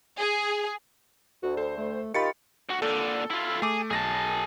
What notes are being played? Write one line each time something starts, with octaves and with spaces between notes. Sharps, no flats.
G#4
D2 F#4
A4 C5
A3
D#3 F4 G4 B5 A6 C#7
D2 F#4
A#2 D3 A4
E4 F4
A3 G#4 D6
B1 G#4 A5 A#6